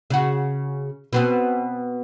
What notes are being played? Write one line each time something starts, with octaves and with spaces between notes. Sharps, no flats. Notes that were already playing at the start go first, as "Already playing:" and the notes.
C#3 F#4
B2 B3 C4